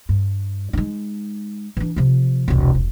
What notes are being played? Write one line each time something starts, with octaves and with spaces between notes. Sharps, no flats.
G2
G#3 D#4
E3 D4
C3 F3
E1 C2
E1